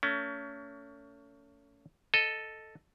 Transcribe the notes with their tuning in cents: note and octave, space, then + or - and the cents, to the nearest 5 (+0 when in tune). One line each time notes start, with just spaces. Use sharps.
A3 +30 C#4 +30
A4 +0 D#5 +0